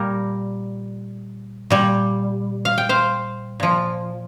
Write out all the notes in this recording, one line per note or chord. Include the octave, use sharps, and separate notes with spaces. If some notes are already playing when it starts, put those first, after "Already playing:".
Already playing: A#2 G3 A#4
A#2 G3
F5
G5
C5 F5
A#2 F3